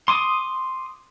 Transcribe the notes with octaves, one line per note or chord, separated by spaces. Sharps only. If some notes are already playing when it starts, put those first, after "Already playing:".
C6 D6 D#6